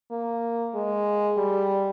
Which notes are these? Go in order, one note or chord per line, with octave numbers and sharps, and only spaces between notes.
A#3
G#3
G3